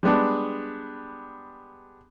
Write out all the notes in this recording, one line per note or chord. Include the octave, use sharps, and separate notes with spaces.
G3 G#3 B3 D4